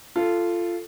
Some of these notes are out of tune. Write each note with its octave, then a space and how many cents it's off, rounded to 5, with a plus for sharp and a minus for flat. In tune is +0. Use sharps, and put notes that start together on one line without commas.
F4 -15 A4 +0